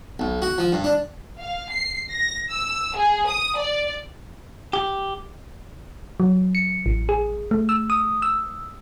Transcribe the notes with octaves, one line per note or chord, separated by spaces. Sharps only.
B1
F#4
F3
G2
D4
F5
C7
A#6
E6
G#4
D#6
D5
G4
F#3
C#7
A1
G#4
A3
E6
D#6
E6